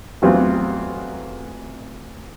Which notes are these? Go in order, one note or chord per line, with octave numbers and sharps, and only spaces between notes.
A1 E2 F#3 B3 C4 F4